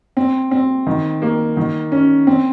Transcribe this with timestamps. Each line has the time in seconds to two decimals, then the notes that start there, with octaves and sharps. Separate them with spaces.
0.17 C4
0.51 C4
0.87 D#3
1.22 A#3
1.57 D#3
1.92 C#4
2.27 C4